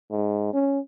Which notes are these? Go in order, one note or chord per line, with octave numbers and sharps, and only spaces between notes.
G#2
C#4